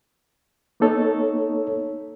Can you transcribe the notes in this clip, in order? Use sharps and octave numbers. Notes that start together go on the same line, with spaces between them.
A#3 B3 D#4 A4 C#5